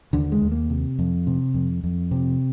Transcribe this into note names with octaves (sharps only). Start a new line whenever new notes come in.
D#2 D3
G#3
D#2
A#3
C3
F2
C3
F2
F2
C3